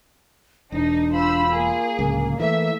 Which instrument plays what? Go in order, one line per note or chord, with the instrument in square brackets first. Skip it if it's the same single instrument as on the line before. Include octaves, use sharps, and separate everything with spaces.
[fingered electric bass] E1 [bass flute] D4 [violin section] D#4
[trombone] F4 [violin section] C5 B5 E6
[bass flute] A#3 [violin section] G#4
[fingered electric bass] D1 C#2
[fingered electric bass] E3 [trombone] A3 [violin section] E5